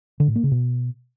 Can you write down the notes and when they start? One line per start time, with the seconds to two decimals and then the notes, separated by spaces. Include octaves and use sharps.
0.20 D3
0.28 A2
0.36 A#3
0.44 C#3
0.51 B2